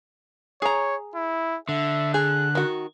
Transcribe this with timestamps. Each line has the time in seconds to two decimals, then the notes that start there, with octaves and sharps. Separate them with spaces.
0.62 G#4 C#5 A#5
1.15 E4
1.69 D3 E5
2.14 G#4 F#6
2.55 D#3 F#4